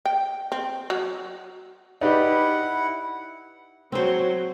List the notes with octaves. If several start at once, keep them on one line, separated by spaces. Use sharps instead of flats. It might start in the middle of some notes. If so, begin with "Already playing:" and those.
G5
C4
F#3
D#4 E4 G4 B4 D5 F#5
F#3 C4 C5